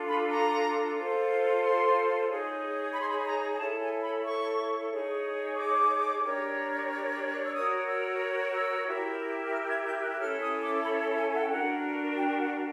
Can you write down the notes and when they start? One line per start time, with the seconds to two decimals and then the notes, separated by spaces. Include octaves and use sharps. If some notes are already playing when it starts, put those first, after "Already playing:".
Already playing: D4 F4 A4
0.08 B5
0.30 A#5
0.96 F4 A4 C5
1.62 C6
2.28 D#4 G#4 C#5
2.94 B5
3.00 C6
3.08 B5
3.26 A#5
3.52 G#5
3.59 E4 A4 C#5 A5
3.82 G#5
4.03 B5
4.25 C#6
4.91 D#4 G#4 C#5
5.57 D6
6.24 D4 G4 A#4 C#5
7.43 E6
7.55 F#4 A#4 C#5 D#6
7.88 E6
8.54 E6
8.86 E4 G4 A#4
9.53 F6
9.64 G6
9.69 G#6
9.86 G6
10.02 F#6
10.19 C#4 E4 A4 C#5 F6
10.41 D#6
10.62 D6
10.84 B5
11.01 A5
11.18 G#5
11.34 F#5
11.42 G5
11.49 D4 F#4 A#4 F#5
12.16 G5
12.39 F#5